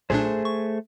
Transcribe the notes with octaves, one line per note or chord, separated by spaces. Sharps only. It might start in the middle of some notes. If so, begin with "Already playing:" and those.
B1 A#2 A3 D4 G#4 C5
C#6